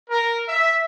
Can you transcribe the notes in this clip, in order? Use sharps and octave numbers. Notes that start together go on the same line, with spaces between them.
A#4
E5